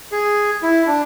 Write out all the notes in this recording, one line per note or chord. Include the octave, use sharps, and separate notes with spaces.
G#4
E4
D4